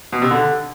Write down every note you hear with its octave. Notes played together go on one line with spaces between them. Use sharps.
B2
C3
D3